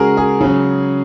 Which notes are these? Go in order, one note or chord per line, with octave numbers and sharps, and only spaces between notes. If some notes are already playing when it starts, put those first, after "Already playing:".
Already playing: C#3 G#3 F#4 G#4 A#4
G#4
C#3 F#3